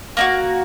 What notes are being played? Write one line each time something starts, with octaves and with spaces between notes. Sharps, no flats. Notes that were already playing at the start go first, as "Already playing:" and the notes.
A#3 D4 F#4 A#5